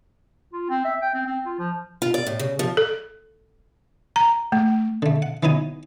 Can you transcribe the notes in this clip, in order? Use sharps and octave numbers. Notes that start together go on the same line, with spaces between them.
F4
C4
E5
G5
C4
C4
F4
F3
F4
D5
A2
C#3
F3
A4
A#5
A3
D3 A3
F#5
E3 F#3 B3 D#4 G#5